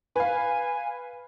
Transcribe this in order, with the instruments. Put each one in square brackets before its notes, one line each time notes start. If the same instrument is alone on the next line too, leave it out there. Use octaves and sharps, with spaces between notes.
[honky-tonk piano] B4 F5 [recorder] G#5